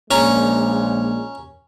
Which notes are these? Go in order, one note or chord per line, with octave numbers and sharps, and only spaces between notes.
A#1 A#2 G#3 C#4 A#5